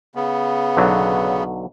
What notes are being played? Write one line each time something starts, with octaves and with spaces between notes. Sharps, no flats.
C#3 B3
B1 D3 F#3